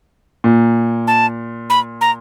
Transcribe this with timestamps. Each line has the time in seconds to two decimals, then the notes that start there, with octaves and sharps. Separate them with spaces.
0.44 A#2
1.07 A5
1.70 B5
2.01 A#5